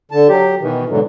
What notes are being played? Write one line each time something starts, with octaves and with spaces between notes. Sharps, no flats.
D3 A5
F#3 G4
B2 D#3 E3
G#2 B2 D3 E3 F#3